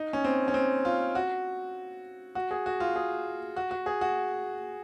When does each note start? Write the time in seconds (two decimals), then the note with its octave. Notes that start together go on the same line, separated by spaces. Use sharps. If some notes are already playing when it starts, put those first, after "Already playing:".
Already playing: D#4
0.13 C#4
0.24 C4
0.48 C#4
0.54 C4
0.85 F4
1.15 F#4
2.35 F#4
2.51 G#4
2.66 F#4
2.80 F4
2.96 G#4
3.56 F#4
3.71 F#4
3.86 G#4
4.01 F#4